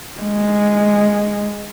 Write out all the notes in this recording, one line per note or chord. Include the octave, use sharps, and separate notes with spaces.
G#3